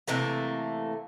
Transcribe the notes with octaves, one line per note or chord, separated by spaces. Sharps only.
C3 E3 A3 A#3